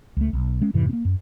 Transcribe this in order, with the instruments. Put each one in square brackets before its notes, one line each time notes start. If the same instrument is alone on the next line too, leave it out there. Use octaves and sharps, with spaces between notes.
[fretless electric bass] C#2 A3
B1
G#3 C#4
F2 G#2 C3 E3
A#3 C4
F#2